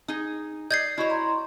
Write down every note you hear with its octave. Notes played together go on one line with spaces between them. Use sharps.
D#4 G#4
D5 D#5 G6 G#6 C7
E4 F#4 C#5 D#5
A#5 C6